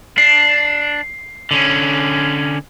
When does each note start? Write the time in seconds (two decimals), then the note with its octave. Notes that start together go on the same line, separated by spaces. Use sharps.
0.18 D4 C7
1.51 D3 C#4